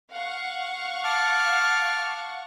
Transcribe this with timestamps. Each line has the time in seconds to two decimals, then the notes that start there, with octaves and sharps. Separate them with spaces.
0.12 F5 F#5 C#6
1.04 A5 D6 F6